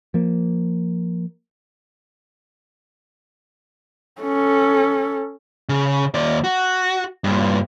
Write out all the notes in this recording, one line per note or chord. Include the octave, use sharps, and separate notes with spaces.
F3 A#3
C#4 A4
C#3
D#2 D5
F#4
G2 A#2